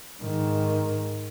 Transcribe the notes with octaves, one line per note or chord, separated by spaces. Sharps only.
G#2 D#3